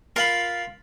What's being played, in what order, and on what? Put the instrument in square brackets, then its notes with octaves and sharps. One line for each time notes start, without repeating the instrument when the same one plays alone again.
[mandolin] F4 [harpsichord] A#4 F5 B5